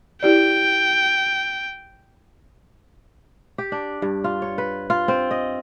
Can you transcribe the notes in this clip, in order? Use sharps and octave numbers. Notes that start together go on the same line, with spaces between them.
E4 G4 D5 G5
G4
D4
G2
F4
C#5
B4
F4
C4
D#5